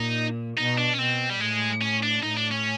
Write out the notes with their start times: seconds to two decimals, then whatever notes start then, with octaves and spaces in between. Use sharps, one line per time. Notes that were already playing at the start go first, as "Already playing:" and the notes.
Already playing: A#2 D#4
0.57 B2 D#4
0.78 D4
0.93 C#4
0.98 B2 C4
1.30 G3
1.40 A2 G#3
1.81 C#4
2.03 D4
2.23 A2 D#4
2.37 D4
2.51 C#4